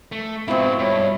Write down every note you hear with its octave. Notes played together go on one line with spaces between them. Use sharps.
A3
G#2 B2 C4 E4 F4
G2 C#5